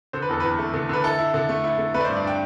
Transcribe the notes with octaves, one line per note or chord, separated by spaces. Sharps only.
D3 C5
B4
E2 A4
E2 B4
A3
D3
D3 B4
E4 A4
E4
D3
A3
E4
A3
A3 B4
D5
C5
G2
D5
D4 G5